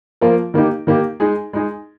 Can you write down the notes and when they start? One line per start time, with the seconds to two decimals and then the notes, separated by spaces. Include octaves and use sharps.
0.21 F3 A#3 F4 A#4
0.54 D#3 A#3 D#4 G4
0.87 D#3 A#3 D#4 G4
1.20 G#3 D#4 G#4
1.53 G#3 D#4 G#4